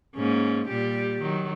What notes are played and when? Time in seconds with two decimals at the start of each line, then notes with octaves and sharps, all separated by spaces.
0.15 G#2 A#3 C#4
0.68 A#2 G3 G4
1.21 D#3 F#3